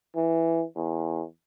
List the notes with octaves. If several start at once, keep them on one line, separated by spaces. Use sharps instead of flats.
E3
E2